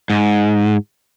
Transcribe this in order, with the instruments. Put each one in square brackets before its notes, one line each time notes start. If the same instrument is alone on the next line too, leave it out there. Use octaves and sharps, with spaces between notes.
[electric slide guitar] G#2